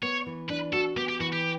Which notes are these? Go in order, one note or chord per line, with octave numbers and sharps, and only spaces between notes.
B3 C#5
E3
D4 B4
F#4 A4
B3 G4
G4
E3 F#4
G4